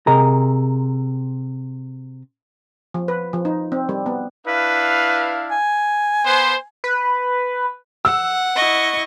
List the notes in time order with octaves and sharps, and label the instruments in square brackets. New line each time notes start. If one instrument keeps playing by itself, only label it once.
[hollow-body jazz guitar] C3 G#4 A#4 D#5 A#5
[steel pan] F3
B4
F3
D#4
C4
G3
B3
[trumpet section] D4 E4 F5 [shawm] B4
[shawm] G#5
[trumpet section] B3 B4 C5
[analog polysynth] B4
[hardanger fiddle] F#5 [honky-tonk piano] E6
[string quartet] E4 D#5 C#6